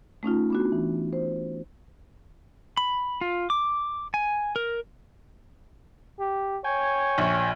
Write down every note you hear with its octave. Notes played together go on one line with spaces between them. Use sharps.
A3 C#4 D#4 F4
B3 D4 F#4
E3
C5
B5
F4
D6
G#5
A#4
G4
C#5 G5 G#5
A#1